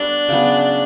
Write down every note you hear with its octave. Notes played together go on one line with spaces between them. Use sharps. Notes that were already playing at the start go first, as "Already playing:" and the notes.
Already playing: G3 B3 D4 F#4 A4
C#3 F#3 B3